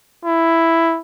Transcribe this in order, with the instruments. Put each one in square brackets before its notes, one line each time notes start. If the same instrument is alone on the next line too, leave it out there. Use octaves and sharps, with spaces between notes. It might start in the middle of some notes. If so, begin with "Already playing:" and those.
[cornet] E4